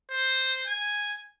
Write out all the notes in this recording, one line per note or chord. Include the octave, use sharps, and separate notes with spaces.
C5
G#5